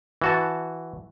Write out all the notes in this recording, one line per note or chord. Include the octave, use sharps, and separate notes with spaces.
E3 F#4 A5